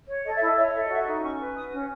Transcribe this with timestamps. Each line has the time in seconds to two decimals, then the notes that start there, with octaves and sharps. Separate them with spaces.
0.09 C#5
0.25 A4 D#5
0.36 E5
0.41 E4
0.46 D#5
0.56 C#5 E5
0.66 D#5
0.74 A4 E5
0.85 D#5
0.90 F#4 E5
1.03 D#5
1.06 D#4
1.22 C#4 C#6
1.40 B4
1.55 F#4 D#6
1.71 C#4